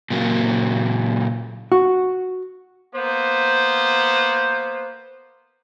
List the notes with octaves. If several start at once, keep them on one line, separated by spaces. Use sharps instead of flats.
A#2 C#3 F#3 A#3
F#4
A#3 B3 C5